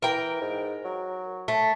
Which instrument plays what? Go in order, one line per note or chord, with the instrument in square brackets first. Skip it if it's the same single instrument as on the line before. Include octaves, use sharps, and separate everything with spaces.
[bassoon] E3 [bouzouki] A#4 G5
[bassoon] G#2
F#3
[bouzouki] A3